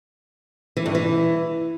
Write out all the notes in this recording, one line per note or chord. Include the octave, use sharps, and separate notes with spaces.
E3
G2
E3